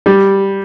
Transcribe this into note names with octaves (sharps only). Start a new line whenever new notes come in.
G3